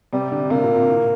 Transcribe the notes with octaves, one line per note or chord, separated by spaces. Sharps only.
C3 G3
D3
C3 A#3
A#2
A#2
A2